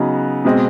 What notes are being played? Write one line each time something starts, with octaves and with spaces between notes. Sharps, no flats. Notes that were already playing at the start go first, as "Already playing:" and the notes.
Already playing: C#3 F#3 B3 D#4
B2 G#3 C4